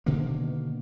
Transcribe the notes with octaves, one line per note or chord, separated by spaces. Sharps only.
B2 D3 D#3 A#3